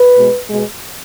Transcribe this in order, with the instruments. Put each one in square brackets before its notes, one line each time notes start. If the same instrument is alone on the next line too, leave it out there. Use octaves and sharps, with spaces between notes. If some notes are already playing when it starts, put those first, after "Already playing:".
Already playing: [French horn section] B4
B2 G#3
B2 G#3